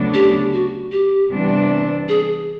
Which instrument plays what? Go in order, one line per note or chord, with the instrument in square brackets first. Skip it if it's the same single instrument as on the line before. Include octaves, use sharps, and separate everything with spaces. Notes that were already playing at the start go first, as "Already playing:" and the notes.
Already playing: [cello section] D2 C#3 F#3 B3 D4
[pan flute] G4
F#4
G4
[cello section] C3 E3 G3 B3 D4
[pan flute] G#4